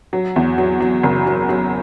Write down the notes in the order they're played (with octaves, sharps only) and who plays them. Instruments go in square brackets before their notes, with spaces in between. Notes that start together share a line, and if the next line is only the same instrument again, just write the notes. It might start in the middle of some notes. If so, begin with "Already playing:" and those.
[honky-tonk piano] F#3
E2
F#3
F#3
F#1
F#3
F#3